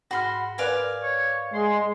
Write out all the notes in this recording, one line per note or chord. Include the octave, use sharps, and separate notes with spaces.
G#2 F#4 B5 C6 F6
A#4 B4 D5 F5 G#5 F#6
C#5
G#3 G#4 C6